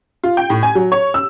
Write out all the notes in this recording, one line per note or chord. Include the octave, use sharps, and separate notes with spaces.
F4
G5
A2
G#5
F#3
C#5
E6